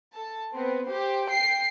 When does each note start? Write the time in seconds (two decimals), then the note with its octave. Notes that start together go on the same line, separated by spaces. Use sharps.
0.13 A4 A5
0.53 B3 C4
0.88 G4 C5
1.28 G5 C7